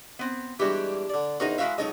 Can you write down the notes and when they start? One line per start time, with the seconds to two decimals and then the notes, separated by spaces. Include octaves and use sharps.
0.19 B3 C4
0.59 E3 G3 G#3 D4 F#4 G4
1.10 D3 D5
1.40 E2 D#4 F#4 A#4 C5 F#5
1.58 G#3 E4 F#4 A#4 E5 F5
1.78 C#2 F#3 D#4 A4 D#5 C#6